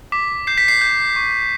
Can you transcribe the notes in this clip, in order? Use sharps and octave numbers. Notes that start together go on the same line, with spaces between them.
D6 B6
G6 C7
B6
C7
G6
C#6